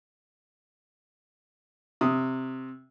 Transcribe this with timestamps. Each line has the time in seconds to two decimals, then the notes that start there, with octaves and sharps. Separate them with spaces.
2.01 C3 D#6